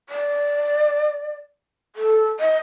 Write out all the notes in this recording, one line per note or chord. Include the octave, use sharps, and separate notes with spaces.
D5
A4
D#5